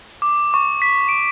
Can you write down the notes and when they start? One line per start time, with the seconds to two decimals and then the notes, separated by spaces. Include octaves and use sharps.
0.22 D6
0.54 C#6
0.82 B6
1.09 D7